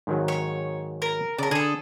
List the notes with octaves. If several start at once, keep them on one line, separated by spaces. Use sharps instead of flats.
G#2 D#3 F#3
C#5
A#4
C#3 A#4 D5 A5
D3 D4 G#4 A4